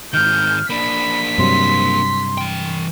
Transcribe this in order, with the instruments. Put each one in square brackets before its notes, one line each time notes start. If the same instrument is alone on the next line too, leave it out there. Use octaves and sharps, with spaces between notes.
[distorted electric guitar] G#2 D#3 [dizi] F6 [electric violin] G6
[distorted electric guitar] A#3 D4 [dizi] B5 [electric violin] B6
[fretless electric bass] G2 C3 F#3 [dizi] C6
[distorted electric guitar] E3 G5